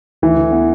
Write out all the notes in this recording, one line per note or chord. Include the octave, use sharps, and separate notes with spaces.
D2 E3
D3
B3